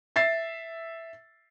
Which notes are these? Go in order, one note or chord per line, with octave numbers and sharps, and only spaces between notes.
E5 A6 C7